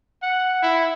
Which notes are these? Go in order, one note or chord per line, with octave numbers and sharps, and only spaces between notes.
F#5
E4